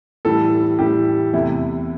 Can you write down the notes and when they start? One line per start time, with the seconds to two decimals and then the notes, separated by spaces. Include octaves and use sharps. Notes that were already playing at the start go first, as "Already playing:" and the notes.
0.25 A2 E3 G3 A4
0.79 A2 E3 G3 G4
1.33 E2 C3 A3 E4